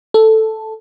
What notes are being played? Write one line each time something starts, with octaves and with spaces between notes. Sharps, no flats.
A4